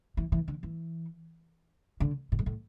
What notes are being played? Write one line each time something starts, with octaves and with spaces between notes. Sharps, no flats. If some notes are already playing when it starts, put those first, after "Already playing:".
E3
E3
D3
E3
D3
A2
G#2
A2